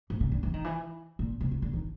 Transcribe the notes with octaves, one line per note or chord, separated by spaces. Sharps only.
A2
C#3
D3
E3
D#3
E3
A#2
C3
C#3
D3
D#3